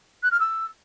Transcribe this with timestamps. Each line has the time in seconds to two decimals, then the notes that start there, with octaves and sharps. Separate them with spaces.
0.23 F#6
0.31 F6
0.40 E6